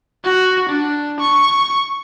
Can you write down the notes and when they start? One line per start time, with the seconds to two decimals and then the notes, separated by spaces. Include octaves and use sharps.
0.24 F#4
0.69 D4
1.20 C#6